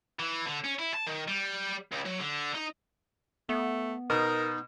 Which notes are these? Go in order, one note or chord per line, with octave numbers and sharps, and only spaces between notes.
E3
D3
C#4
E4
A5
D#3
G3
C#2
F#3
D3
D#4
A3 B3
B2 D#4 A#4